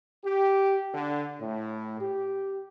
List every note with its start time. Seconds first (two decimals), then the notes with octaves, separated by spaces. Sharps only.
0.23 G4
0.93 D3
1.39 A2
2.00 G4